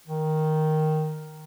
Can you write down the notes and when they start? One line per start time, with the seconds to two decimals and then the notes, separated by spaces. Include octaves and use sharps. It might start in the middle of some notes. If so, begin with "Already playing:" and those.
0.07 D#3